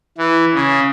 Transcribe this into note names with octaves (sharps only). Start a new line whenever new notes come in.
E3
C#3